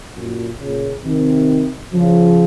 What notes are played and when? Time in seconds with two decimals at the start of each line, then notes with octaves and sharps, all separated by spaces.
0.14 F#2 A#2
0.59 A#2 C#3
1.04 C3 D#3
1.93 C#3 F3